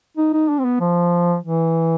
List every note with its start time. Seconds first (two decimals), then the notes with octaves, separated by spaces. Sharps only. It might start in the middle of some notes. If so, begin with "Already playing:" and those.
0.17 D#4
0.33 D#4
0.49 D4
0.58 C4
0.64 B3
0.80 F3
1.43 E3